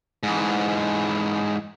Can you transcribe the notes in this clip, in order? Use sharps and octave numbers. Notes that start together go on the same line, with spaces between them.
G#2 E3